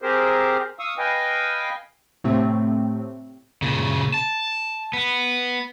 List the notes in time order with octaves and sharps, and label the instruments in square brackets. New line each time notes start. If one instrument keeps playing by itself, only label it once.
[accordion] C4 G4 G#4 A#4 C5
F5 C#6 D#6 E6
B4 D#5 F5 G5 G#5
[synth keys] A2 C3 A3 C4
[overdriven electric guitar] A#2 C#3
A5
B3